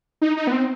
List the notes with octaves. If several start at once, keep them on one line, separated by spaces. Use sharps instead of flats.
D#4
D#4
B3
C4